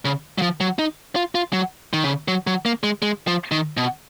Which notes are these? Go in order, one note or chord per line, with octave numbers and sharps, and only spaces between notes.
C#3
F#3
F3
F#3
D#4
F4
F4
F#3
D#3
C#3
F#3
F#3
A#3
G#3
G#3
F3
D#3
B2